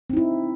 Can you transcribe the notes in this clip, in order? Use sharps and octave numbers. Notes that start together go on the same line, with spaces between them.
C4 D#4 E4